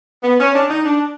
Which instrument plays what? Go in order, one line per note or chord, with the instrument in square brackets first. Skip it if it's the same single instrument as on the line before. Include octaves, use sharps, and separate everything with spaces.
[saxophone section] B3
C#4
D4
D#4
D4